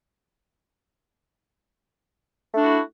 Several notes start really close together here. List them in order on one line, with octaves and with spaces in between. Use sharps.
A3 D4 F#4 E4